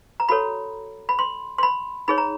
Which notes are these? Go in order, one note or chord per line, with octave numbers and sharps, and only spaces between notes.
A#5
F#4 A4 C#5 B5
B5
C6
C6
B5
D#4 G#4 C#5 B5
A#5